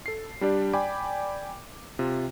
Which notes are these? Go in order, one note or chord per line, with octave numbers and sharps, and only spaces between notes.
A4 C7
G3 D4 G4 D5
D5 G5 G#5 B5 D6
C3 F4